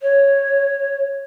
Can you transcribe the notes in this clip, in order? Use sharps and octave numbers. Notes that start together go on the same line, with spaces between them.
C#5